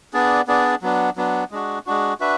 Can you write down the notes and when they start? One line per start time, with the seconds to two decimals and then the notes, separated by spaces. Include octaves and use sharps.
0.13 B3 D4 G#4 D5
0.47 B3 D4 G#4 D5
0.82 F#3 B3 D4
1.16 F#3 B3 D4
1.51 G#3 D4 F#4
1.86 G#3 D4 F#4
2.20 D4 F#4 B4 E5